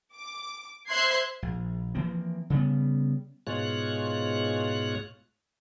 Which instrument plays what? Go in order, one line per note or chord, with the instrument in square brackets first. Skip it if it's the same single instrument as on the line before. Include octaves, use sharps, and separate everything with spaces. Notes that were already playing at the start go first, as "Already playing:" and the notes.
[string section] D6
C5 E5 C6 F#6 G#6 C7
[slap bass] A#1
E3 F3 A#3 C4
C#3 G3 B3
[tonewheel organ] G#2 B2 G#3 F4 C#5 F#6